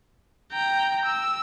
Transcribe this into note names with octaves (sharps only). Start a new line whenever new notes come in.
G5 A#5
E6